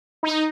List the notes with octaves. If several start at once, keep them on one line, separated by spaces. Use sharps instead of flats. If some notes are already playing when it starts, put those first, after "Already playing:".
D#4